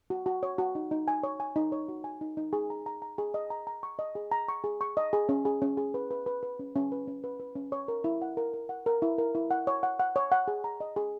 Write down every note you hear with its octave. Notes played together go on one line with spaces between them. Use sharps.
F#4
F#4
C#5
F#4
D#4
D#4
G#5
C#5
G#5
D#4
C#5
F#4
G#5
D#4
D#4
G#4
A#5
A#5
A#5
G#4
D#5
A#5
A#5
C#6
D#5
G#4
A#5
C#6
G#4
C#6
D#5
G#4
C#4
G#4
C#4
G#4
B4
B4
B4
B4
C#4
C#4
B4
C#4
B4
B4
C#4
C#5
A#4
E4
F#5
A#4
A#4
F#5
A#4
E4
A#4
E4
F#5
C#5
F#5
F#5
C#5
F#5
G#4
A#5
D#5
G#4